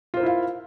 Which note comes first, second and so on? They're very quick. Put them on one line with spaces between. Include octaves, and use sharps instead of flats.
F4 C5 A#4 E4 F5